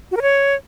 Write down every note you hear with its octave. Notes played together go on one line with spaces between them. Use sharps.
F#4
A#4
C#5